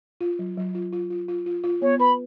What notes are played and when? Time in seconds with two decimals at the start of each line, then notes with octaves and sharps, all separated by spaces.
0.21 F4
0.39 F#3
0.57 F#3
0.75 F4
0.93 F4
1.11 F4
1.28 F4
1.46 F4
1.64 F4
1.82 B3 C#5
2.00 B4 B5